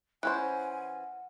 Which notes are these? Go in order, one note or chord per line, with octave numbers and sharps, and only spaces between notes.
E3 C#4 C5 F#5 G#5 F#6